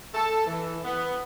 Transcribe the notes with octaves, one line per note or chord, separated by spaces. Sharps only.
A4
E3
B3